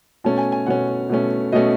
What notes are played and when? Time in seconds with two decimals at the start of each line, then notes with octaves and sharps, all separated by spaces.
0.24 B2 A3 C#4 A5
0.38 G#5
0.52 G#5
0.66 B2 A3 C#4 F#5
1.09 B2 A3 C#4
1.52 B2 A3 C#4 D#5